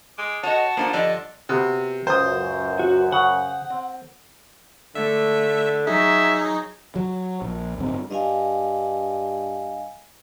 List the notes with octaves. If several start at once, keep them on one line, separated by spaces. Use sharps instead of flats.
G#3 D6
F#4 C#5 D#5 A5
F3 A#3 D4 F#5
G2 D3 F3 D5 D#5
C3 B3 F#4
C#2 F#2 C5 D#6
F#4
C#3 F#5
C4
D3 A3 E5
F#3 D#4 G#4 E5
F#3
A#1
D1 G2 C4
G2 D#5 F5 G#5